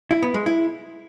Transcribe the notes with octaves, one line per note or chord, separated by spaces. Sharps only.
E4
B3
G#3
E4